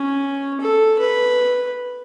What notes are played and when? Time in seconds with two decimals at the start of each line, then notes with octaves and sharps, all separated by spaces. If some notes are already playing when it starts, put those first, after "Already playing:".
Already playing: C#4
0.60 A4
0.99 B4